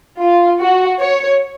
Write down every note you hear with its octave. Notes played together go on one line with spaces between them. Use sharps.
F4
F#4
C#5